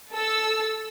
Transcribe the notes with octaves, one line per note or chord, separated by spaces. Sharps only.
A4 E6